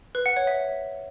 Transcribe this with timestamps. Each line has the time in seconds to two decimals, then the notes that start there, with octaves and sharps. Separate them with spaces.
0.15 B4
0.26 F#5
0.36 C#5
0.47 E5